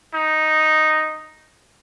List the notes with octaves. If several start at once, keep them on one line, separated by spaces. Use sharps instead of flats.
D#4